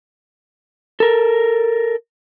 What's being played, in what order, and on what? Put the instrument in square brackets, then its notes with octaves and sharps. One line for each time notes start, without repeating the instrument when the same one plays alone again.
[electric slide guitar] A4 A#4